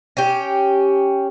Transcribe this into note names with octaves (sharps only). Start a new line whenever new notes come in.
C#4 G4